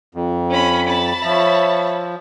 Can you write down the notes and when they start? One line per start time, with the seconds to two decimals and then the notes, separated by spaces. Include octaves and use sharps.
0.15 F2
0.51 C#4 B5
0.88 A5 B5
1.24 F3 C#5 E5